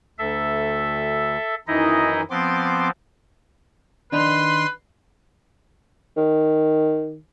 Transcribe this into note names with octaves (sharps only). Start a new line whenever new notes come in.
D2 A4 E5
F#2 D#3 E3 D#4 E4 D#5
F3 B3 C4 C6 D6
D#3 D4 D#4 B4 C6
D#3